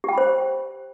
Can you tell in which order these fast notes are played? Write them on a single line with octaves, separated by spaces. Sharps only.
G4 G5 B5 C5